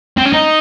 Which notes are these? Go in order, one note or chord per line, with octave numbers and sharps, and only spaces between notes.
C4
C#4
D#4